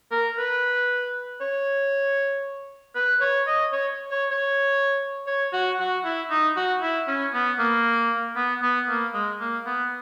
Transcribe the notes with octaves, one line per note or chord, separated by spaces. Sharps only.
A#4
B4
C#5
B4
C#5
D#5
C#5
C#5
C#5
C#5
F#4
F#4
E4
D#4
F#4
E4
C#4
B3
A#3
B3
B3
A#3
G#3
A#3
B3